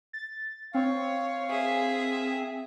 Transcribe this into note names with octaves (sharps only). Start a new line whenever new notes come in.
A6
C4 C#5 F5
G#4 E5